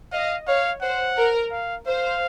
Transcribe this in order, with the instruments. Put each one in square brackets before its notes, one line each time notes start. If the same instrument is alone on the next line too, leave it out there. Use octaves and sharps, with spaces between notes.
[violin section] D#5 [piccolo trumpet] F5
[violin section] C#5 [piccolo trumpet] F5
[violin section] C5 [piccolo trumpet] F#5
[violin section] A#4
[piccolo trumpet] F5
[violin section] C5 [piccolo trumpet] F5